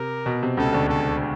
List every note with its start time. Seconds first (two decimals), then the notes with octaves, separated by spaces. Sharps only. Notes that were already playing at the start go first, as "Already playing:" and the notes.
Already playing: C3 A#4
0.26 B2
0.43 C3
0.57 C#2 C#3 A4
0.73 D2 D3
0.89 A4